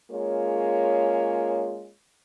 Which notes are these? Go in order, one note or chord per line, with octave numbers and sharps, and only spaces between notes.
G#3 A#3 C#4 F4 G#4 C#5